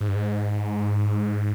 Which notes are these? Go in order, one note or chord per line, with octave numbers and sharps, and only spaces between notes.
G#2
G2
G#2